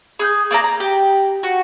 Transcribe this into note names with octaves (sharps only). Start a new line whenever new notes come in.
G#4 F#6 G6
A#3 D5 E5 A#5
A#5
G4
F#4